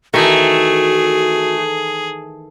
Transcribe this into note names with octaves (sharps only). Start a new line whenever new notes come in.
D#3 E3 A3 F#4 G#4